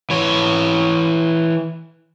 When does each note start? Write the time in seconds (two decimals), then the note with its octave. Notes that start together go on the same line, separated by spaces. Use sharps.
0.10 E3 C#5